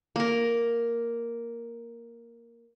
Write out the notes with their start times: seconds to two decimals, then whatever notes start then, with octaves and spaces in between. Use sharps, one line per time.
0.16 A#3 A#4